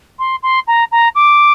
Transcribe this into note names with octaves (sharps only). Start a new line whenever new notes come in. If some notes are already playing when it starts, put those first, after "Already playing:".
C6
C6
A#5
A#5
D6